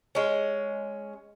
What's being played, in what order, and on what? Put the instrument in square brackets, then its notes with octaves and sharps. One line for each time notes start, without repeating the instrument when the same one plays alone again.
[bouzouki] G#3 C#4